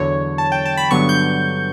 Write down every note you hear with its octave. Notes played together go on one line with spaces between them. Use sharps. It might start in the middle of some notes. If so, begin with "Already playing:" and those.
Already playing: E2 D3 F#3 C#5
A5
G5
A5
B5
G2 D3 F#3 B3 C#6
G6